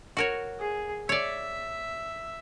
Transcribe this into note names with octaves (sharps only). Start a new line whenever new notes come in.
F#4 A#4 C#5
G#4
C#5 D5 E5